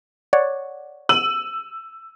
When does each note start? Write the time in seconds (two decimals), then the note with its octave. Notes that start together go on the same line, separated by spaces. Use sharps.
0.33 C#5 D5 F#5
1.09 E6 D#7 F#7